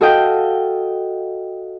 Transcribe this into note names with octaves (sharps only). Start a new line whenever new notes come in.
F#4 A4 D#5 F5 G5